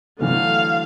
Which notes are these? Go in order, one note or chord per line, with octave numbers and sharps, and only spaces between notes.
D3 E3 F#3 A3 F5